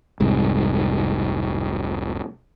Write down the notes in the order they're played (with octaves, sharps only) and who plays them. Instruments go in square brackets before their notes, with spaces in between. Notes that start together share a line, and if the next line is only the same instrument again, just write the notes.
[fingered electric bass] F1 C2 G#2